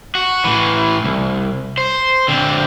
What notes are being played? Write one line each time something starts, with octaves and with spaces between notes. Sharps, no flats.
F#4
A2 E3
C2
C5
D3 C4